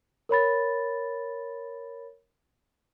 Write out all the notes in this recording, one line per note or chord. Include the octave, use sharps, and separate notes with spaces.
A#4 C#5 B5 A6